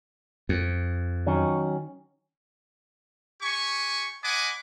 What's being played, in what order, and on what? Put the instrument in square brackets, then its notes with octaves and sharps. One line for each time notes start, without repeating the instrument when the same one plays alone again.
[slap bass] F2
[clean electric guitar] D#3 F#3 C#4
[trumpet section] G4 G#5 C#6
D#5 F#5 G#5 B5 D6